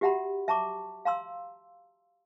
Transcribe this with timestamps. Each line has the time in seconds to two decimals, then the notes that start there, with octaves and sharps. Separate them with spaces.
0.01 F#4 G4 E5 F#5 A#5 B5
0.48 E5 A5 A#5 C#6 D6
1.05 F5 A#5 C6 E6